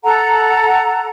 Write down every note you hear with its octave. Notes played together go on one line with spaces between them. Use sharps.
A4 F#5 A#5